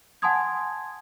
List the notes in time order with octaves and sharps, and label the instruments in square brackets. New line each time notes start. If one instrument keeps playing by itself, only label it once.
[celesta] F#5 G#5 A5 C6 D#6 G#6